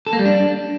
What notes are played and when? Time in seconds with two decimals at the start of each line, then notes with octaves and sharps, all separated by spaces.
0.07 A4
0.13 A#3
0.19 G3
0.25 D4